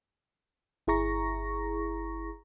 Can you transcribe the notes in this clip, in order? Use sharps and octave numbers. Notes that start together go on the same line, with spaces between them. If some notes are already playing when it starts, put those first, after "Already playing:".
G1 E4 G#4 A#5 C#6 A#6